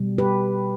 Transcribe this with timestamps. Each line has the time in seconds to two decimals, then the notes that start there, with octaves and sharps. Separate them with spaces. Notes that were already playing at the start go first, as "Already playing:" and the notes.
Already playing: B2 G3
0.18 G4 B4